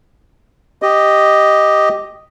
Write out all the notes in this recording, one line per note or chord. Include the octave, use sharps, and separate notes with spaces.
G4 D#5